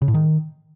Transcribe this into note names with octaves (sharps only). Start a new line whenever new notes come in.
C#3
A2
D#3